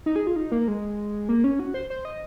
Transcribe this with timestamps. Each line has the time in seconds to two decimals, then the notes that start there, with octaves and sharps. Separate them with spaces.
0.06 D#4
0.16 G#4
0.27 F4
0.36 D#4
0.52 A#3
0.68 G#3
1.29 A#3
1.44 C#4
1.59 F#4
1.74 C5
1.90 C5
2.05 D#5